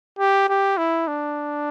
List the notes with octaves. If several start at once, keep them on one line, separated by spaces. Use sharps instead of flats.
G4
G4
E4
D4